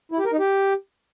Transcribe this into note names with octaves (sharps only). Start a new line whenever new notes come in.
E4
G4
A#4
D#4
G4